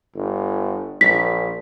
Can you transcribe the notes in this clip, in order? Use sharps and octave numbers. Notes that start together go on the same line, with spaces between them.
G1
A#1 B6